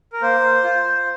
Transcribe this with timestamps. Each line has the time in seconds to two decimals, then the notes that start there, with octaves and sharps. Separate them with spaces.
0.13 A#4
0.22 A#3 C5
0.64 F4